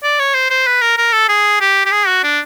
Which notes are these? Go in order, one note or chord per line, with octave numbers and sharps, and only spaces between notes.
D5
C#5
C5
C5
B4
A#4
A#4
A4
G#4
G4
G4
G#4
F#4
D4